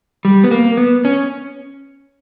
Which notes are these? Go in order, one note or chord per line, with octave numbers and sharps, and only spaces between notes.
G3
B3
A#3
B3
C#4